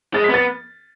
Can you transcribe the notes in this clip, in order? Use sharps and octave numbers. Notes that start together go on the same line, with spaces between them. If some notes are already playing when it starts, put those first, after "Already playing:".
G#3 A6
B6
B3 A6